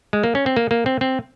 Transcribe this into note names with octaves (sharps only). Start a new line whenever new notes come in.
G#3
A#3
C#4
C4
A#3
A#3
C4
C4